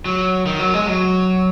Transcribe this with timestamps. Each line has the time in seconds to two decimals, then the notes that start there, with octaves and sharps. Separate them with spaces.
0.06 F#3
0.46 D#3
0.59 F#3
0.74 G#3
0.87 F#3